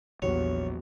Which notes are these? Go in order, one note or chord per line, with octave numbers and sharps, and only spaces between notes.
A#1 E2 F#3 G3 F#4 C#5